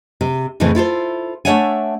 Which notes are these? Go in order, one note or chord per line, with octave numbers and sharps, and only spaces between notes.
C3
F2 A2 C#3 E3 A3 C4
E4 F4 A4 C5
A3 D4 C#5 E5 F#5 G#5